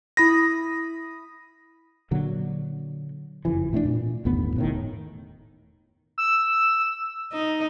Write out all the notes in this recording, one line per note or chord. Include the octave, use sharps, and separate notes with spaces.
E4 B5 D#6 A#6
A#2 D3 F#3
F#1 F2 E3
A2 A3 C4 D4
A#2
G1 D#2 A2 B3
E1 A2 D#3
E6
D#4